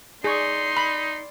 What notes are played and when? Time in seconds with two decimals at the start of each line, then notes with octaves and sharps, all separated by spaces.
0.24 D#4 G#4 D5 C6 C#6
0.77 D5 B5